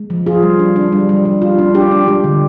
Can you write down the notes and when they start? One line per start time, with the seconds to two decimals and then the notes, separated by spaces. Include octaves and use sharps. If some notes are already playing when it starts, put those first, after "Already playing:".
Already playing: G#3
0.10 F3
0.26 F4 G#4
0.43 G3
0.59 D4
0.76 D4
0.92 G3
1.09 G3
1.25 G3
1.42 F4
1.58 D4
1.74 D4 G4
1.91 D4
2.08 G#3 G4
2.24 D3